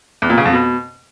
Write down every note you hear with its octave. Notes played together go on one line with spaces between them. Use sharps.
E2
A#2
C#3
F2
B2